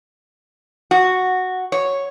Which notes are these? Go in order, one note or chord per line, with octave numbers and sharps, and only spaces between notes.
F#4
C#5